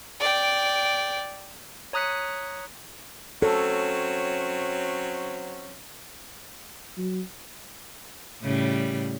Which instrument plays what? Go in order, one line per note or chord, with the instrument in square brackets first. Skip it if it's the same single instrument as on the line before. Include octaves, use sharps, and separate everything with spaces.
[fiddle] D5 G5
[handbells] C#5 A#5 D#6 F#6 B6 C#7
[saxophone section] F#3 C4 C#4 [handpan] A4
[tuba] F#3
[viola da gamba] A2 C#3 G3